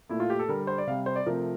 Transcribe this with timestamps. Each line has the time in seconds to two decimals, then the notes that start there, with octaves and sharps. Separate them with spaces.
0.09 A#2 A3 E4
0.20 F4
0.30 G4
0.39 A4
0.48 D3 G3 A#4
0.67 C5
0.78 D5
0.87 C3 G3 F5
1.06 C5
1.16 D5
1.26 C3 F3 A3 A#4